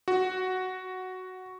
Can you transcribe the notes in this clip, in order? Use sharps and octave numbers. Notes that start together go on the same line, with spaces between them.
F#4